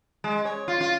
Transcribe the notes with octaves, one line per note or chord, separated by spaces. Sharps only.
G#3
C#5
F4
F4